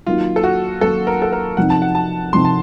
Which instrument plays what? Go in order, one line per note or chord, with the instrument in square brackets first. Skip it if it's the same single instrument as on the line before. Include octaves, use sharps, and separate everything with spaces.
[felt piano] D#3 F#3 A#3 D#4 F#4 [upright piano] F4
[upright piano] A4
F#4
[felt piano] D#3 F#3 A#3 D#4 F#4 [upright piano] A4
[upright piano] A#4
A4
A#4
[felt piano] C3 F3 C4 D#4 [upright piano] F#5
[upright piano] A5
F#5
A5
[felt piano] C3 F3 C4 D#4 [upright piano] C6
[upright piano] A5